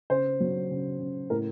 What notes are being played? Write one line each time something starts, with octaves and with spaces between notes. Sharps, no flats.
C#3 C5
F#3
C#3
C#3
A2 A#4